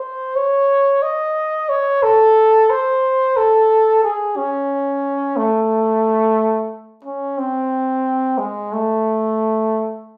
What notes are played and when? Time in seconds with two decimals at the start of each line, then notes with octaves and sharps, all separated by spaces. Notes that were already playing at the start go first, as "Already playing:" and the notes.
Already playing: C5
0.36 C#5
1.02 D#5
1.69 C#5
2.03 A4
2.70 C5
3.37 A4
4.04 G#4
4.36 C#4
5.37 A3
7.04 C#4
7.38 C4
8.38 G#3
8.73 A3